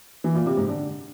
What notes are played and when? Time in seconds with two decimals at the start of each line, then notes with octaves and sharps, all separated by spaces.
0.24 E3
0.35 A#2
0.46 C3
0.57 G#2
0.68 D3